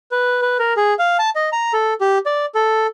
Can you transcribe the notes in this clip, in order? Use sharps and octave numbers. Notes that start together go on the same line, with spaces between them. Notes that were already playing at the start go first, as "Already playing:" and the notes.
B4
B4
A#4
G#4
F5
A5
D#5
A#5
A4
G4
D5
A4